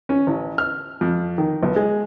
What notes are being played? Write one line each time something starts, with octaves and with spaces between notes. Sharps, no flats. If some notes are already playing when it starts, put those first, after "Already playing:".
C#4
A1
F6
F2
D#3
B1
G#3